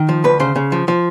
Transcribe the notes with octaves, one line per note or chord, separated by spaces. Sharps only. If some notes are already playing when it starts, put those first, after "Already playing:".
Already playing: D#3
F3
D2 B4
C#3 C5
C#3
F3
F3